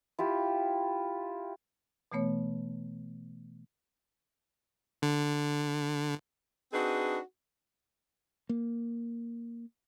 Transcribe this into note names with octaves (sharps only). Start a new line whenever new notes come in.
E4 F4 G4
B2 E3 A3 B3 C#5
D3
C4 D4 D#4 F#4 G#4 B4
A#3